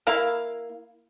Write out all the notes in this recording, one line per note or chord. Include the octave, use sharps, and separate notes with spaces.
A#3 E4 F5